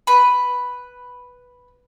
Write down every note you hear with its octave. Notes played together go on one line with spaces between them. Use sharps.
B4 B5